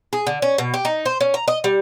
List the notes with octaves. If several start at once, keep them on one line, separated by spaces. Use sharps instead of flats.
G#4
D3
C#4
B2
G4
D#4
C5
C#4
A#5
D#5
G3